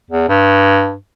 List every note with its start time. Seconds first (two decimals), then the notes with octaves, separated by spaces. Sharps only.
0.11 E2
0.29 G2